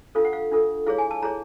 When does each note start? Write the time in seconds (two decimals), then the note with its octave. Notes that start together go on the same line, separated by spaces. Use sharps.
0.15 D4 F4 A4 F5
0.25 F#5
0.33 F5
0.51 D4 F4 A4
0.86 E4 G#4 C#5 F5
0.98 G#5
1.11 A5
1.22 E4 G#4 C#5 A#5